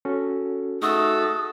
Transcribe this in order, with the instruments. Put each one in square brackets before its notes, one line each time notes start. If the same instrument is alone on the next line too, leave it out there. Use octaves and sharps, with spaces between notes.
[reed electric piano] C#4 F#4 A4
[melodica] A3 F#4 [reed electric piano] D#4 G#4 [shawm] A4 [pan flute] D#6